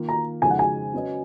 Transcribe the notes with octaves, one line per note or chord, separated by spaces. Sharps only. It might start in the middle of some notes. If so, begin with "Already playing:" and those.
Already playing: D#3 A#3 F4
A#5
F2 C#3 G#3 D#4 F#4 G#5
F#5
G#5
F#3 C#4 F#4 B4 D#5